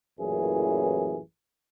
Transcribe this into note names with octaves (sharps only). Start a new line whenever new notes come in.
A1 F#2 A#2 E3 G#4